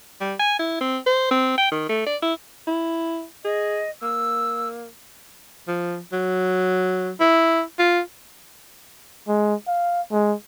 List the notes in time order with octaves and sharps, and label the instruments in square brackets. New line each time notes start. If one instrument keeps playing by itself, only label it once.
[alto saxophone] G3
G#5
E4
C4
C5
C4
G5
D#3
A3
D5
E4
E4
[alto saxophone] G#4 [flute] D#5
[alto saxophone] A#3 [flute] E6
[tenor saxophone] F3
F#3
E4
F4
[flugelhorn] G#3
F5
G#3